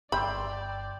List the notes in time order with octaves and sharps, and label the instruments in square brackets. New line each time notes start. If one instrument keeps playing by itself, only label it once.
[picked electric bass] G1 [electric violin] D5 [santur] G5 C6 E6 [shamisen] B5